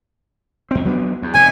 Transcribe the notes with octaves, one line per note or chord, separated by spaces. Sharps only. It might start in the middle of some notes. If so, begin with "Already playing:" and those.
F2 C4
F#3 B3 D4
E2
F1 G#2 C3 G#5